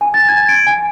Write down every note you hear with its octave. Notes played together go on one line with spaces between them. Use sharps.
G#5
A6
G#6
D7
G#5